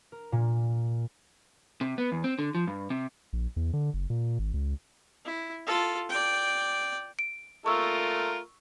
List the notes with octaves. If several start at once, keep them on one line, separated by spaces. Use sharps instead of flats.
A#4
A#2
C3
B3
E2
C4
D3
F3
G2
C3
A#1
E2
D3
F#1
A#2
G#1
C#2
E4
F4 A4
D5 G5
D7
A3 F4 A#4 C#6 E6